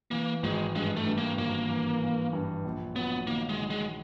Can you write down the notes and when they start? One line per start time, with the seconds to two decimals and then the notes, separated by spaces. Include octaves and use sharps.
0.11 E3 A#3
0.43 G#1 G#3
0.75 G2 G#3
0.97 A3
1.07 G2
1.18 A#3
1.37 G#1 A#3
1.69 E3
2.02 E3
2.33 G2
2.65 A#1
2.95 F#3 B3
3.27 D#3 A#3
3.49 G#3
3.60 D#3
3.70 G#3